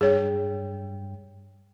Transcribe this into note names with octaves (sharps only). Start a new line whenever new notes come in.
G2 G3 G#4 C#5 G5